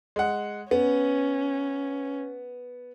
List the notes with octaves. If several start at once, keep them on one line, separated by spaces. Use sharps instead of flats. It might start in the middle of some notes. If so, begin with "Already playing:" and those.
G#3 F#5
B3 C#4